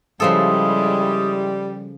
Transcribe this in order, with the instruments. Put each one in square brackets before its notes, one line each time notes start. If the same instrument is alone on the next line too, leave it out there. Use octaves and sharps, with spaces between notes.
[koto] C#3 F3 A4 [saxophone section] G3 [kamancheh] G#3 E4 [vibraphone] D#6